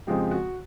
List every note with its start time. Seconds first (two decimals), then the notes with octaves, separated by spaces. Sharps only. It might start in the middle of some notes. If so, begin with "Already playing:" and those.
0.07 F2 C#3 F3 G#3 G4
0.31 F#4